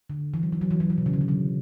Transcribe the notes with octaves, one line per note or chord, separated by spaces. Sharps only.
D3
E3
F#3
E3
F#3
E3
F#3
E3
B2
C#3
D3
E3
F#3